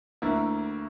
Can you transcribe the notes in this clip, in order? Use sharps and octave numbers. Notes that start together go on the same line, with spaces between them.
D2 D3 A#3 E4